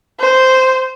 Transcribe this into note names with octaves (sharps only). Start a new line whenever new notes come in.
C5